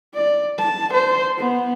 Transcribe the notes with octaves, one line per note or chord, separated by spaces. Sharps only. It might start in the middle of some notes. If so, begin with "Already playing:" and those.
D5
A5
C5
B3